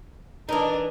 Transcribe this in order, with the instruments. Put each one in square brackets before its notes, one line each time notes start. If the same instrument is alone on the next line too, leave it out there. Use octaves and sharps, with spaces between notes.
[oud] E3 D#4 [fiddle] D4 A#4